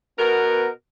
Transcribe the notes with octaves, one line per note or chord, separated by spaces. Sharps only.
B2 B3 A#4